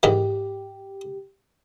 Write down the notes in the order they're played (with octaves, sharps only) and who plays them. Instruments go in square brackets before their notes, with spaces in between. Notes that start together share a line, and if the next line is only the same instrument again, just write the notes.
[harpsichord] G#2 D#3 E3 [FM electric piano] G4